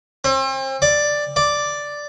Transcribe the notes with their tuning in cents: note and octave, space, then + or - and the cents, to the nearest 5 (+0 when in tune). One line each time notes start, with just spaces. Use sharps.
C4 +40
D5 +5
D5 +0